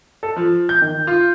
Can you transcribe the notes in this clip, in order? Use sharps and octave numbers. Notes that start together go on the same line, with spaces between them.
A4
F3
G6
D#3
F4